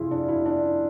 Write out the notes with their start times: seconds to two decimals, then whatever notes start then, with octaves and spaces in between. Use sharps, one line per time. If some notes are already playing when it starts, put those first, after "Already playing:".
Already playing: F2 C3 E4 F4 G#4
0.11 D4
0.28 E4
0.46 D4